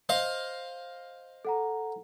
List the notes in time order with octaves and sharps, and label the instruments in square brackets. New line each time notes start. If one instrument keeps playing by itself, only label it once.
[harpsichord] C5 D#5 F5
[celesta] A4 F#5 A#5